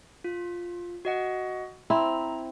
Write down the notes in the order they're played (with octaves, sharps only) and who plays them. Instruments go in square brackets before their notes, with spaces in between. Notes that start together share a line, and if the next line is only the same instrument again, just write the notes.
[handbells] F4
F#4 D#5 F#5
[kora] C4 E4 [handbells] A#5